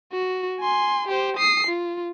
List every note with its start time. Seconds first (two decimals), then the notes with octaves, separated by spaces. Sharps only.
0.12 F#4
0.60 G#5 C6
1.08 G4 C5
1.37 D#6 C7
1.67 F4